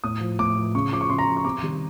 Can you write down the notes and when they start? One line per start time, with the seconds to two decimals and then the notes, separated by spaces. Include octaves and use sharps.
0.04 A2 D#6
0.21 F3
0.39 A2 D6
0.57 F3
0.75 C#3 C#6
0.92 F3 D6
1.01 C#6
1.09 C#3 C6
1.19 A#5
1.28 F3
1.37 C#6
1.45 C3 D6
1.63 D#3 G3